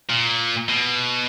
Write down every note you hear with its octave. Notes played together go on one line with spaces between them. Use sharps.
A#2
B2